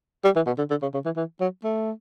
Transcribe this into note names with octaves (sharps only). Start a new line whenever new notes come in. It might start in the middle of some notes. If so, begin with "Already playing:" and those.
G3
E3
B2
D3
D3
C#3
C#3
E3
E3
F#3
A3